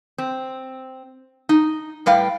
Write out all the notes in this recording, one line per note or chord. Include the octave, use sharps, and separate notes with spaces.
C4
D#4
A2 G3 B4 F5 G5